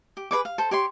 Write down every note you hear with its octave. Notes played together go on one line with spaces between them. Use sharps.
G4
G#4 B4 C#5 D6
F5
A4 C5
G4 C#5 C6